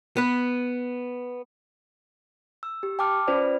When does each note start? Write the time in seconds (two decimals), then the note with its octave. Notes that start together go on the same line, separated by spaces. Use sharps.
0.17 B3 B4
2.63 E6
2.83 G4
2.99 G5 A5 D6 F6
3.28 C#4 F4 B4 C5 D5